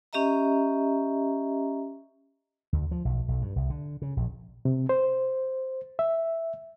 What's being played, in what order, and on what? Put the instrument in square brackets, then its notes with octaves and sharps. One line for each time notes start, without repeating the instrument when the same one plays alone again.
[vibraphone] C#4 G4 D#5 E5 A#5
[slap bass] D2
F3
B1
B1
G2
C2
D3
C#3
A#1
[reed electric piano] C3
C5
E5